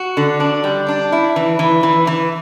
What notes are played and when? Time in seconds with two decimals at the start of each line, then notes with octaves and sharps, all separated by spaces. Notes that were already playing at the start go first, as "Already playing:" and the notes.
Already playing: F#4
0.17 D3
0.40 D4
0.64 G3
0.88 D4
1.12 E4
1.36 E3
1.59 E3
1.83 E3
2.07 E3